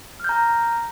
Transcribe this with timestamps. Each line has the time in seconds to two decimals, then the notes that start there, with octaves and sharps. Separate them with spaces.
0.20 F6
0.24 G6
0.29 A#5